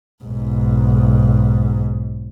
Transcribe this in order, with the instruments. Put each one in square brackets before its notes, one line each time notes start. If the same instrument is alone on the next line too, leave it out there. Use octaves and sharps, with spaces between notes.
[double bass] B1 G#2